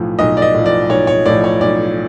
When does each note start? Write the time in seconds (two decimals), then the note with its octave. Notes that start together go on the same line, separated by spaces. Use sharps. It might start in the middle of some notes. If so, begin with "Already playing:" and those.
Already playing: B1 A2 F3
0.19 B1 D#5
0.37 D5
0.42 D#5
0.54 A2 F3
0.66 D5
0.90 B1 C#5
1.07 C#5
1.26 A2 F3 D5
1.44 C#5
1.61 B1 D5